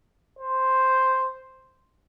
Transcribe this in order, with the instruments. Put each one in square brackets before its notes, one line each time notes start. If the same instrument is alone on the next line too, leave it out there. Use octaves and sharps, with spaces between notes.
[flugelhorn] C5